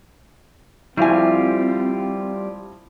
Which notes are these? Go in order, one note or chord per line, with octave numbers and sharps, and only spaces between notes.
F3 G3 A3 C4 E4 F4 G4 G#5